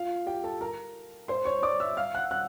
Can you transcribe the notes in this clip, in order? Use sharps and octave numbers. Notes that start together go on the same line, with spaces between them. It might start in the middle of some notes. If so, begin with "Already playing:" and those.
Already playing: F4 F5
G4 G5
A4 A5
A#4 A#5
C5 C6
C#5 C#6
D5 D6
E5 E6
F5 F6
F#5 F#6
F#5 F#6